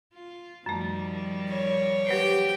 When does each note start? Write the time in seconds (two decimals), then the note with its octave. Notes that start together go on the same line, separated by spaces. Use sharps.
0.13 F4
0.66 F#2 D#3 F3 G3 A3
1.49 C#5
2.07 F#3 G4 B4 C5 G5